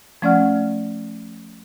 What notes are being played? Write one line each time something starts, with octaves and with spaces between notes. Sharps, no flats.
F3 A3 C#4 D5 F#5 F6